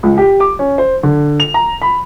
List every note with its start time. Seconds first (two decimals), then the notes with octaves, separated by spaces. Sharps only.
0.03 C#2
0.18 G4
0.40 D6
0.59 C#4
0.78 C5
1.03 D3
1.40 F7
1.54 A#5
1.82 B5